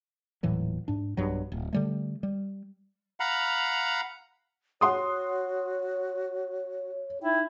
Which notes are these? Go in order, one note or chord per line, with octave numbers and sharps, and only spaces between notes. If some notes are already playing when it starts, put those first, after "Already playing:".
D#1 A2 E3 F#3
G#2 D4
B1 G2 F#3
D1
D3 G3 A3
G3
F5 F#5 A#5 B5
F#4 C#5 F#5 C6 D#6
D#4 E4 G5